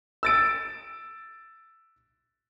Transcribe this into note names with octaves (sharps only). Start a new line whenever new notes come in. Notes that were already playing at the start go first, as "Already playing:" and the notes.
E6 A6 D7